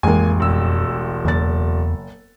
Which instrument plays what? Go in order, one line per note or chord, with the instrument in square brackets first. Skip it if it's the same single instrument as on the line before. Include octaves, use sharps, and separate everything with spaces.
[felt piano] A1 G#3 [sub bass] F2 [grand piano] A#3 G#5
[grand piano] E1 E6
[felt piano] F#1 A6 [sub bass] E2